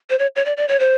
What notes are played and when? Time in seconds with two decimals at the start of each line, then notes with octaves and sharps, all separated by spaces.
0.10 C5
0.19 C#5
0.36 C#5
0.45 D5
0.57 D5
0.68 C#5
0.79 C5